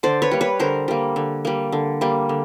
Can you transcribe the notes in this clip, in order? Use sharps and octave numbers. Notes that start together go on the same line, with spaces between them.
D3 C5 D5
B4 C#5
G3 A#3
B4 C#5
D3 A#4 C5
G3 A#3
D3
G3 A#3
D3
G3 A#3
D3